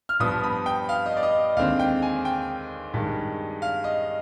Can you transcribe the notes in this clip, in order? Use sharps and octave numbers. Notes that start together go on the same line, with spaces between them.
F6
G2 F3 B3 D#6
B5
G5
F5
D#5
D5
D#5
D#2 D3 G#3 C4 F5
G5
G#5
G5
G2 D#3 G#3
F5
D#5